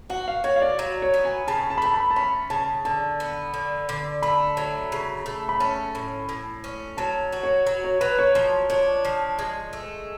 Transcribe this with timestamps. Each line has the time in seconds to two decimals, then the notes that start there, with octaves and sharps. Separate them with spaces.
0.10 F#4 F#5
0.28 F5
0.44 F#4 C#5
0.56 F5
0.62 D5
0.79 F#3
1.02 C#5
1.14 B3
1.25 G#5
1.48 C#3 A5
1.70 A5
1.78 B5
1.82 A3 A5
1.94 B5
2.11 A5
2.16 C#4 B5
2.50 C#3 A5
2.85 D3 A5
3.20 B3
3.54 D3
3.89 D3
4.22 A3 B5
4.57 F#3
4.92 C#3
5.26 A3
5.49 B5
5.60 C#4 A5
5.95 A2
6.29 A2
6.64 C#4
6.97 F#3 A5
7.32 F#4
7.43 C#5
7.67 F#3
7.84 C#5
8.01 F#3 B4
8.19 C#5
8.35 F3 C#5
8.70 D4 C#5
9.05 F3
9.39 G#3
9.73 A3